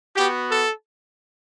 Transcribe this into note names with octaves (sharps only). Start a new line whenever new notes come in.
B3 F#4 G4
A4